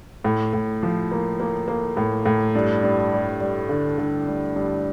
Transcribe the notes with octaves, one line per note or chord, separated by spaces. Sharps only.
A2
A2
F3
A#3
A#3
A#3
A2
A2
G2
G2
G3
G3
D3
D3
G2
G2